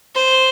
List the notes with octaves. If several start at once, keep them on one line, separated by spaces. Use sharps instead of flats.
C5